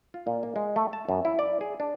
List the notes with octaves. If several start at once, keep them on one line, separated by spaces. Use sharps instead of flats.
F4
A#2
A#3
G#3
A3
A5
F#2
E4
D5
G#4
D4